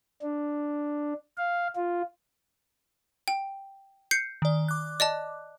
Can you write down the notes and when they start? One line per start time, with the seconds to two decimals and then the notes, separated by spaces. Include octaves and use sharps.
0.22 D4
1.38 F5
1.76 F4
3.28 G5
4.11 G6 C7 C#7
4.42 D#3 D5
4.68 D6 F#6
5.00 D5 D#5 A5